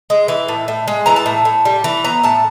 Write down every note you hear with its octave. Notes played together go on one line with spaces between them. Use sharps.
G#3
E3
A2
A2
G#3
E3 A#5
A5
A2
A2
G3
E3
B3 A#5
A2 A5